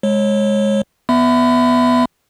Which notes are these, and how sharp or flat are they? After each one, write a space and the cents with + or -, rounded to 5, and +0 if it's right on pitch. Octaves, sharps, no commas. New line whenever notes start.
G#3 +0 C#5 -25
B3 +0 E5 +0 B5 +30